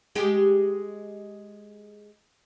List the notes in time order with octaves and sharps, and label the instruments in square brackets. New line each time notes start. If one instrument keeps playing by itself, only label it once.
[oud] G#3 G4